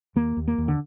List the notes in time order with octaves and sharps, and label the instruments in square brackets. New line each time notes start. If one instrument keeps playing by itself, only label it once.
[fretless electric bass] D#2 A#3
D#2
A#3
D#2
D3